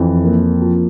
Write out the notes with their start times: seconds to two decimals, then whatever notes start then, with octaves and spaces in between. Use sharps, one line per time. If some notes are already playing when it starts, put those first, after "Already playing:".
Already playing: F2 E3
0.24 A#3
0.62 F3